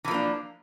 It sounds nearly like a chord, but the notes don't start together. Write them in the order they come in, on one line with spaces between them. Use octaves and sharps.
E3 F3 A#3 D4